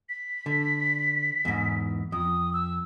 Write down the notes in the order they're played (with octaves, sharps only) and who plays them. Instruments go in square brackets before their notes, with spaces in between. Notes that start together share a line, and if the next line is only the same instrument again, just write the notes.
[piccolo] B6
[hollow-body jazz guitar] D3
E2 G#2
[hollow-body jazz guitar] F2 [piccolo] D#6
[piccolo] E6